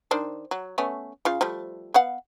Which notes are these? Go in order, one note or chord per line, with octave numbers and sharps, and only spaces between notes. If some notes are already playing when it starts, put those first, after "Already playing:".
D#3 D4 C5
F#3
A3 B3 C#4
C#3 F4 F5
F3 G3 A3
B3 F5 F#5